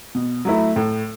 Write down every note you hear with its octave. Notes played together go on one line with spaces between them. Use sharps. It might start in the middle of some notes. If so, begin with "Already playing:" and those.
B2
F#3 A3 E4
A2